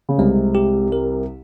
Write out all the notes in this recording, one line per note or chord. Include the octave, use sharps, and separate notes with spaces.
C#3
C2 C3 G#3
G4
A#4